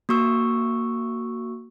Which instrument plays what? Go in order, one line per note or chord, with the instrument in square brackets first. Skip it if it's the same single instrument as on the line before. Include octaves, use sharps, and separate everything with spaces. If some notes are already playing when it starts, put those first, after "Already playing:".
[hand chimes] A#3 F#4 C#6 E6